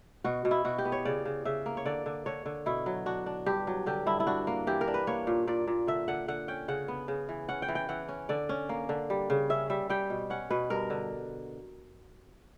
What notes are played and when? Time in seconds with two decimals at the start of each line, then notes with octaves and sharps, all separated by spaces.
0.24 B2 F#4
0.45 B2
0.51 E4
0.65 B2 F#4
0.78 G4
0.85 B3
0.92 C#5
1.05 C#3 D5
1.25 C#3
1.45 C#3 E5
1.66 A#3
1.77 C#5
1.85 D3 D5
2.06 D3
2.26 D3 C#5
2.46 D3
2.66 B2 E4
2.86 F#3
3.06 D4 F#4
3.26 D4
3.46 G2 G4
3.67 F#3
3.86 D3 G4
4.06 G2 E4
4.20 E4
4.27 D4 F#4
4.47 A#3
4.67 E3 G4
4.81 A#4
4.88 D4
4.94 B4
5.07 A#3 C#5
5.27 A#2
5.47 A#2 D5
5.67 A#2
5.87 D3 E5
6.08 D3 F#5
6.28 D3 F#5
6.48 C#4 G5
6.68 C#3 F#5
6.88 B3
7.08 C#3
7.29 E3
7.48 C#4 F#5
7.62 G5
7.68 E3
7.75 G5
7.89 E3 F#5
8.09 C#4
8.29 D3 D5
8.49 C#4
8.69 A#3
8.89 D3
9.10 G3
9.30 C#3
9.50 C#4 E5
9.70 G3 E5
9.90 G3 G5
10.10 B2
10.30 C#4 F#5
10.50 B2 B4
10.70 G2 A#4
10.90 D3